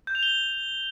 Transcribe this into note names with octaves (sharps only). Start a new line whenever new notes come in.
G6
F7
G7